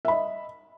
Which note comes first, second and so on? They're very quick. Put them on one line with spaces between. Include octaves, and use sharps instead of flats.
E5 B5 D#5